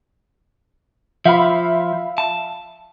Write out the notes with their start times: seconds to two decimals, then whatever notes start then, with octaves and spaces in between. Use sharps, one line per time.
1.25 F3 E5 F5 B5
2.18 A5